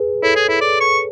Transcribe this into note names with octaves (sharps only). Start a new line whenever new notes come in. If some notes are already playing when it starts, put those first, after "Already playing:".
Already playing: G#4 B4
E4 A4 C#5
G#4
E4
D5
C#6